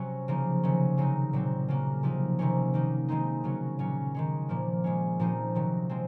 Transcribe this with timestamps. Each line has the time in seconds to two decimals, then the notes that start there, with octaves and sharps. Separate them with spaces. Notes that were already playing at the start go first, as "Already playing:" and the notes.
Already playing: C3 F#3 C#4
0.28 C#3 F3 A#3 D#4
0.63 C3 D#3 F#3 C#4
0.97 C#3 F#3 C4 D#4
1.33 A#2 F#3 C4
1.68 C#3 F#3 A#3
2.03 C3 F3 A#3 D#4
2.39 C3 D#3 A#3 C#4
2.74 D#3 A#3 D#4
3.09 D#3 G#3 C4 D#4
3.44 C#3 F#3 C#4
3.79 A#2 F#3 C#4
4.14 D#3 G#3 C#4
4.49 A#2 F3 A#3
4.84 A#2 G#3 C#4
5.19 A#2 F3 C4 D#4
5.55 C3 D#3 F#3
5.89 F3 G#3 C4